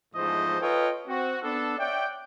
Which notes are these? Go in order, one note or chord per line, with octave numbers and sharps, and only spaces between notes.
E2 G#2 F3 A3 C5 D#5
F4 A4 B4 C#5 D#5 G5
C4 F#4
B3 D4 A4
C#5 D5 E5 F#5 G5